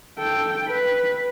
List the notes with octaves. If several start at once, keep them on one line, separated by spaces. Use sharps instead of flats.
A4 G5
B4